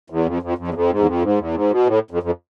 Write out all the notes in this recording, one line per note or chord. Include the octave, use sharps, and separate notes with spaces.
E2
F2
F2
F2
E2
F2
G#2
E2
F2
G#2
E2
G#2
B2
A2
F2
F2